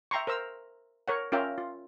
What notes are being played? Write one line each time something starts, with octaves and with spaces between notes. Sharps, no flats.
E5 G5 A#5 C6 C#6
A#4 C5 A#5 E6
A#4 C#5 F#5
C#4 F4 A#4 E5 F5 G5
F4